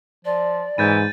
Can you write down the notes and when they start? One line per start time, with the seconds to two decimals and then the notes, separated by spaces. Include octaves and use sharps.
0.25 F3 D5
0.78 G#2 E3 G6 A6 D#7